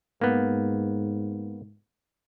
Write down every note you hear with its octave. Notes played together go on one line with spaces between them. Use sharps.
G#2 A#3 B3